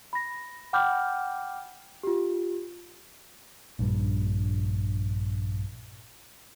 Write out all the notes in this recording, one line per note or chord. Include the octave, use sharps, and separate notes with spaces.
B5 A#6
F#5 G5 B5 D6 F6 G6
F4 G4
A#1 G2